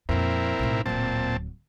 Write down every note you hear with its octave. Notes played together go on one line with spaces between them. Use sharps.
F2 A#2 C4 E4 A#4
B1 A2
D1 A#2 F#3 C4 A5